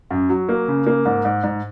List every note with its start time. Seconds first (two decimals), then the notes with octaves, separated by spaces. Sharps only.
0.10 F#2
0.29 F#3
0.49 A#3
0.68 C#3
0.87 A#3
1.05 G#2
1.25 G#2
1.43 G#2